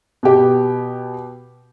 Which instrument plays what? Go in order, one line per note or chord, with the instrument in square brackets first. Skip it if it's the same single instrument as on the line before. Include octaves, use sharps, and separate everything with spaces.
[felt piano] B2 G4